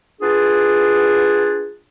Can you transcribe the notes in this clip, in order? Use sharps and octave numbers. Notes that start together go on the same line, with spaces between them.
B3 D4 F4 G#4